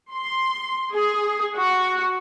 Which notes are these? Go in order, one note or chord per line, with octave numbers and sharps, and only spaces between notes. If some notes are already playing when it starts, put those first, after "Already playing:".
C6
G#4
F#4